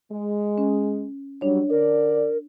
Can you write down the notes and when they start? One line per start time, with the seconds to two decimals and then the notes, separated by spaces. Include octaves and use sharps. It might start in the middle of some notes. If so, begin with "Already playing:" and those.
0.11 G#3
0.58 C#4
1.41 F#3 G3 D4 C#5
1.70 D3 A#4 D5